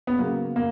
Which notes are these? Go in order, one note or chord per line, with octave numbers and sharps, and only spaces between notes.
B3
C#3 F#3 A#3
A#3